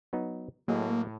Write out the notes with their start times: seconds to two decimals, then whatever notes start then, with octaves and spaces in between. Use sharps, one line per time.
0.13 F#3 B3 D#4
0.68 A2 F#3 A#3 G#4 D#5